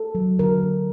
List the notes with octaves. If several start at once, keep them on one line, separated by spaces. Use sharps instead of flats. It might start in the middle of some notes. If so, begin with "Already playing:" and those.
Already playing: A4
F#3
D3 A#4
D3